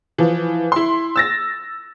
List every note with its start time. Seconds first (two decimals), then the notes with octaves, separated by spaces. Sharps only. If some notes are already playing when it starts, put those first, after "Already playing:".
0.18 E3 F3
0.72 E4 C6
1.16 E6 A6 A#6